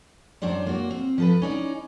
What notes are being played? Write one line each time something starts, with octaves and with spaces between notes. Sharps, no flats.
F#2 F#3 D4 C5 D5
A#3 F#4
C4
F3 A4 B4
C#4 D#4 D5